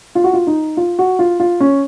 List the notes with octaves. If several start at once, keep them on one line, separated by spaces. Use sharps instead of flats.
F4
F#4
F4
D#4
F4
F#4
F4
F4
C#4